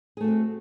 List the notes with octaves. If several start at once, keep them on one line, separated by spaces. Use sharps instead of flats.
A3 C4 F#4 G#4